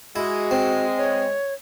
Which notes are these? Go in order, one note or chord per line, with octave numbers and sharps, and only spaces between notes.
G#3 E4 F#4
C4
C#5